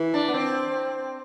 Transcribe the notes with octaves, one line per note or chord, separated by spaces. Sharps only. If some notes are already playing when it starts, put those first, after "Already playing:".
Already playing: E3
D4
B3
C4